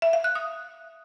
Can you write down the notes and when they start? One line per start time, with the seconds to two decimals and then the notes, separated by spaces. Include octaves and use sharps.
0.02 E5
0.13 F5
0.24 F#6
0.35 D#6